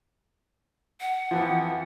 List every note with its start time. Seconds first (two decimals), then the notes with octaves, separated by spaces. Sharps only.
1.01 F#5
1.31 F2 E3 F3